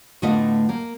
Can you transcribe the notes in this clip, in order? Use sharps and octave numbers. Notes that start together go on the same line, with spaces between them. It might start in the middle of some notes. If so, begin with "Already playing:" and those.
A2 D3 A3 B3 F4 D#5
A#3